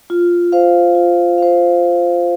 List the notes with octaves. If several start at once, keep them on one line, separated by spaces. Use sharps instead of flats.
F4
C5 F5
F4
C5 F5